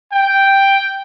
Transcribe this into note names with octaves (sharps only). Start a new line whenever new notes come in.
G5